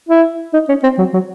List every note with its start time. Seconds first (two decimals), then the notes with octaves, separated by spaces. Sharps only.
0.09 E4
0.53 D#4
0.68 C#4
0.83 C4
0.98 F#3
1.14 F#3